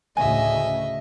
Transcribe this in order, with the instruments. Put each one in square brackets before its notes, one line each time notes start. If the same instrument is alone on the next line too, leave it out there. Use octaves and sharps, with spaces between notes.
[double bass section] D2 A2 C#3 [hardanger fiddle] D#5 E5 [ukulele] G#5